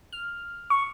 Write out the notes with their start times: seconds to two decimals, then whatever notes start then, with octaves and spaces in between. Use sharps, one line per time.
0.13 F6
0.70 C#6